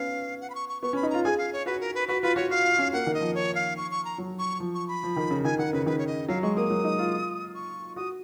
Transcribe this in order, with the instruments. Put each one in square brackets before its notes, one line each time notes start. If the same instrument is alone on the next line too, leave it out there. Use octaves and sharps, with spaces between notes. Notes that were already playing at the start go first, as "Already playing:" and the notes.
Already playing: [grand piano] B3 C#4 [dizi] F5
[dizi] F#5
B5
C#6
C#6
[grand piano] B3 [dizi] C#6
[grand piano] C#4 [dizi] B5
[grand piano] D#4
[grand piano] F4 [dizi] A#5
[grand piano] G#4 [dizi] G#5
[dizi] F5
C#5
[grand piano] F#4 [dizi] B4
[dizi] A#4
B4
[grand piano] F#4 [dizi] B4
[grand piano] F4 [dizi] B4
[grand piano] F#4 [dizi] C#5
[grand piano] F#4 [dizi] F5
[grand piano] F4
C#4
[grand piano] A#3 [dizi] F#5
[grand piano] D#3
[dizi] D#5
[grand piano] F3
[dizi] C#5
F5
C#6
C#6
A#5
[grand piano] F#3
[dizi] C#6
[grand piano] F3
[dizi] C#6
B5
[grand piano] F3
D#3
C#3
[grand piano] D#3 [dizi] G#5
[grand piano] D#3 [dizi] F#5
[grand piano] C#3 [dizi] B4
[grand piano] D#3 [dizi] B4
[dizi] C#5
D#5
[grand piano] F#3 [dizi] F5
[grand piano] G#3 [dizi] C#6
[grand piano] A#3 [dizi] D#6
[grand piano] F#3
D#4
F4
[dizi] C#6
[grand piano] F#4 [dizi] D#6